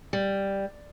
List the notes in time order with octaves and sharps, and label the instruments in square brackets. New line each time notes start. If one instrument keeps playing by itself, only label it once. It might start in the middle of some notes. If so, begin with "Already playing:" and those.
[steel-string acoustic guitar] G3